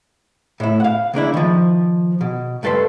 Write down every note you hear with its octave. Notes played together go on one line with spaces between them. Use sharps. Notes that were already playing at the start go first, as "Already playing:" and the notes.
A2 E4
F5 F#5
C#3 A#3 D4 E4
D#3 F3
B2
C#2 G2 A4 B4 C6